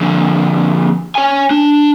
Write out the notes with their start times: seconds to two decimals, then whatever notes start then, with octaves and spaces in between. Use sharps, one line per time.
0.01 F2 D3
1.15 C#5 G#5
1.51 D4